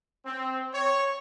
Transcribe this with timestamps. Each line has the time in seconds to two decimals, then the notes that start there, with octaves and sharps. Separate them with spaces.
0.25 C4
0.74 C#5